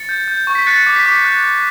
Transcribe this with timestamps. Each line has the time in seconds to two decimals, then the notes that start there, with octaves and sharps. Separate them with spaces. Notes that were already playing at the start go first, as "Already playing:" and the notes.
Already playing: A6 C#7
0.09 G6
0.28 G6
0.47 C#6
0.55 B6
0.66 F#6 A6 C#7
0.87 D6
0.96 B6
1.06 D6
1.25 F#6
1.44 F#6